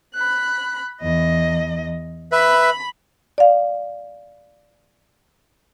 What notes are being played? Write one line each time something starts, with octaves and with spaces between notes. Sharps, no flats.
B5 F#6
E2 D#5
B4 E5 B5
D5 F5